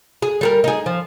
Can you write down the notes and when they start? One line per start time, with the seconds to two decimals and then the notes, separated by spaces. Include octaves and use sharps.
0.22 G#4
0.41 G3 A4 A#4
0.64 D#4 G#4
0.86 F3